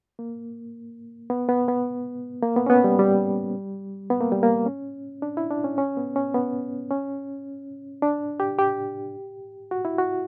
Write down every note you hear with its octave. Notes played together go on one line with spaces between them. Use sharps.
A#3
B3
B3
B3
A#3
B3
C#4
B3
G3
G3
B3
A#3
G3
A#3
C#4
D4
E4
D4
C#4
C#4
B3
C#4
B3
C#4
D4
G4
G4
F#4
E4
F#4